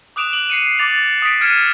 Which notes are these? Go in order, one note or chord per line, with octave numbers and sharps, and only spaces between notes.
D6 D#6 F#6 D7 E7 F7
F#7
C7 C#7 D#7
D6 A6 F7
D#6 A6 B6 D7
F6 G#6 C#7 D#7 E7